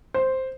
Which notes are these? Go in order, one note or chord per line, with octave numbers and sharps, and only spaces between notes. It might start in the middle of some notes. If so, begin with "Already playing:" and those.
C5